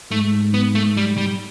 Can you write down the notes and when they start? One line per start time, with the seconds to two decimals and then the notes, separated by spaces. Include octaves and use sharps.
0.11 G#2 A3
0.54 B3
0.75 A3
0.97 G3
1.18 G3